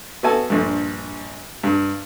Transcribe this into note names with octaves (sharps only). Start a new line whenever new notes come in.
B3 F#4 A4 E5 G#5 A5
A#1 G2
G2